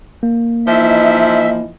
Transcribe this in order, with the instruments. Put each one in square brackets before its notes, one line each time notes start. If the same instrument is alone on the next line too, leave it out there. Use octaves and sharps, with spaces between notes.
[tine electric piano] A#3
[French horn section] E3 D#4 D#5 [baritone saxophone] F3 [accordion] E5